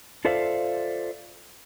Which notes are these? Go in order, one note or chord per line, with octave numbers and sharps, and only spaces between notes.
F4 A4 C5 D5 E5 F5